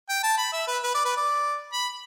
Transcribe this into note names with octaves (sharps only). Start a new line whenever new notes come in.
G5
A5
B5
E5
B4
B4
D5
B4
D5
B5